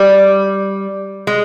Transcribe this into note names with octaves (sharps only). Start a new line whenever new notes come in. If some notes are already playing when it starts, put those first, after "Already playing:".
Already playing: G3
G#3